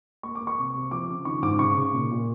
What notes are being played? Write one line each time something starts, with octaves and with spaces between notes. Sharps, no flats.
A#3 C#6
A#3 D6
C#6
C3
C3
F3 D6
C#3
D#3 C#6
G#2 D6
C#3 C#6
C#3
A#2
A#2